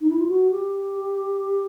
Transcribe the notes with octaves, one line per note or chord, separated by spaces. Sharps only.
D#4
E4
F4
F#4
G4